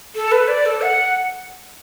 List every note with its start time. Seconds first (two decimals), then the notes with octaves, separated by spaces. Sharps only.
0.16 A4
0.32 B4
0.48 D5
0.66 A4
0.82 F#5